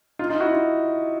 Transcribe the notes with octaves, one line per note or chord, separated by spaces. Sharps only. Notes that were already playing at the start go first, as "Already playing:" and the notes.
D#4 F4
D#4 F4
E4 F#4
D#4 F4